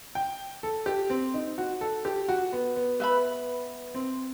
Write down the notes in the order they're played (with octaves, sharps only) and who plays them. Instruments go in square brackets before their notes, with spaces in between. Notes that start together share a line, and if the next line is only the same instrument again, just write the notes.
[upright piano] G5
A4
G4
C4
D#4
F#4
A4
G4
F#4
B3
B3
[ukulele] B4 E5 B5
[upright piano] C4